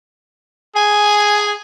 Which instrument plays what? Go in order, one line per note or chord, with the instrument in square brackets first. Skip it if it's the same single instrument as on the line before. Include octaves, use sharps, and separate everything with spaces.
[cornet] G#4 [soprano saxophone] G#5